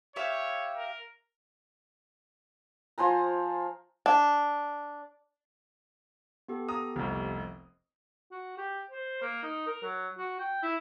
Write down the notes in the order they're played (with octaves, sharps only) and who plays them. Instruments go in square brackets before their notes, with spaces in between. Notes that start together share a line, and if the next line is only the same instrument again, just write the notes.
[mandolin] G4 E5 F5 [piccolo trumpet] C#5
[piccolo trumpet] A#4
[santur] F3 C5 G#5 A#5
[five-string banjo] D4
[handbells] B3 G4 A4
[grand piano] A#5 D#6
F1 C2
[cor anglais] F#4
G4
C5
A#3
D#4
A#4
F#3
F#4
G5
E4